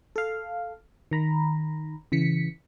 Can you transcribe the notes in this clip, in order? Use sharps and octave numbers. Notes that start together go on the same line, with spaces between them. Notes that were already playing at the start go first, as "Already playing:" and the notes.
A4 F5
D#3 A#5 B5
C#3 E3 B6 C#7